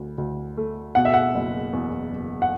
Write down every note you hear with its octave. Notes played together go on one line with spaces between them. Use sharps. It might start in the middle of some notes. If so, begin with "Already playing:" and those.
Already playing: D2
D2
A3
B2 F#5
E5
F#5
F#1
E2
F#1
F#5